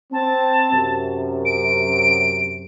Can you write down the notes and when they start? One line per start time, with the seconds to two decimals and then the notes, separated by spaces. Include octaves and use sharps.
0.13 C4 A5
0.73 F#2 C3
1.45 D7